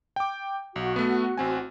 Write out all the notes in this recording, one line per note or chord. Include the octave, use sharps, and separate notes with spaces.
G5 D6
B1 F#4
A3 B3
A1 C4 G#5